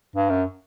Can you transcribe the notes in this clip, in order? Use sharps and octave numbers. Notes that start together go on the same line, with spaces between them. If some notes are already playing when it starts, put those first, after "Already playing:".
G2
F#2